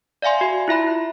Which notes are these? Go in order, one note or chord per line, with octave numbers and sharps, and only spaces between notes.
D5 E5 F5 G#5 C6
F#4
E4 F4 E5 B5